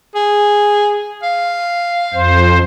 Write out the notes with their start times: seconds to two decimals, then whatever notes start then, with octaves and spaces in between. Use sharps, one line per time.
0.15 G#4
1.23 F5
2.14 F2 C5